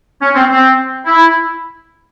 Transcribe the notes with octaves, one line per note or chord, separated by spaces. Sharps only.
C#4
C4
C4
E4